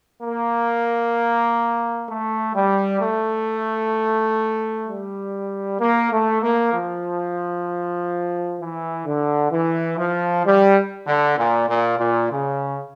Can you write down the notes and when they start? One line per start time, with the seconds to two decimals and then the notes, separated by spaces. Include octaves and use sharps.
0.23 A#3
2.08 A3
2.55 G3
3.01 A3
4.87 G3
5.81 A#3
6.11 A3
6.42 A#3
6.73 F3
8.59 E3
9.05 D3
9.52 E3
9.98 F3
10.45 G3
11.06 D3
11.37 A#2
11.69 A#2
11.99 A#2
12.31 C#3